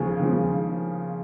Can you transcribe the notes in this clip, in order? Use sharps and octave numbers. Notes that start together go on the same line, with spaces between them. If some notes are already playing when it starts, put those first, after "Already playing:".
Already playing: D#2 C#3 F3 G#3
D#2 C#3 F3 G#3